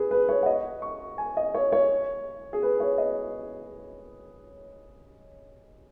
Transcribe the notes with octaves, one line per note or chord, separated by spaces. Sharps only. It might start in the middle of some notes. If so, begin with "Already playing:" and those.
Already playing: G#4 B4
B4
C#5
F#5
D#5
C#6
G#5
D#5
C#5
C#5
G#4
B4
C#5
D#5